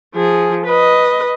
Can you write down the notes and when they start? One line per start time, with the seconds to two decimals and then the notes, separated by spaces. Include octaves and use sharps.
0.15 F3 G#4
0.66 B4 D#5